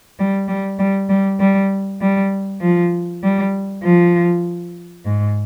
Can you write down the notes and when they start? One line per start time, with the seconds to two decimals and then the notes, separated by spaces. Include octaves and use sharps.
0.19 G3
0.48 G3
0.79 G3
1.09 G3
1.40 G3
2.01 G3
2.61 F3
3.23 G3
3.83 F3
5.05 G#2